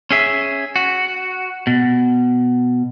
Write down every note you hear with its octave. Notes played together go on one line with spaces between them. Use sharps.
C#4 G#4 E5
F#4
B2